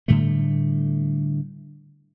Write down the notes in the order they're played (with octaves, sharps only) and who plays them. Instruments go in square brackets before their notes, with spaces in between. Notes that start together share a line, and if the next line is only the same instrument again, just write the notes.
[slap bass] A2 D3 G3 A3